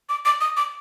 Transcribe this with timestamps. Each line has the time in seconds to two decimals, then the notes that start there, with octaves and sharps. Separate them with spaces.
0.09 D6
0.25 D6
0.41 D#6
0.57 D6